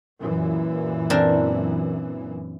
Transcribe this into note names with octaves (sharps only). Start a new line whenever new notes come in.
F#2 A#2 E3
C4 D4 A#4